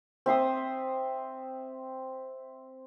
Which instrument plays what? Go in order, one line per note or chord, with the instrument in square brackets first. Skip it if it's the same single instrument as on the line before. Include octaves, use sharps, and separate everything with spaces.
[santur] C4 E5 C6 D#6